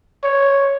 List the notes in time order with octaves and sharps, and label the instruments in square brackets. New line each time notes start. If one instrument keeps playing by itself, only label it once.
[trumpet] C#5